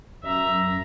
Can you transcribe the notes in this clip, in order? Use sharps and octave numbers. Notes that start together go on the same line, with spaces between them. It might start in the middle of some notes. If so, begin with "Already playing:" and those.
F#2 E5 A#5